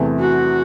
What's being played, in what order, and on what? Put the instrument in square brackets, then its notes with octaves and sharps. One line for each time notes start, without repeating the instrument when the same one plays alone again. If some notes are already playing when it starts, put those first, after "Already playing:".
Already playing: [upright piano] E2 C3 E3 A3
[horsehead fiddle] F#4